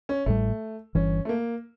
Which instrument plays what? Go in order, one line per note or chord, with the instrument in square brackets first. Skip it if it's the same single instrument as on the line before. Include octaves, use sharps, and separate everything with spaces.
[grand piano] C#4
[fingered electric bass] A1 A2 G3 [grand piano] A3
[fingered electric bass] G1 G2 E3 [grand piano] C#4
[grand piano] A3
A#3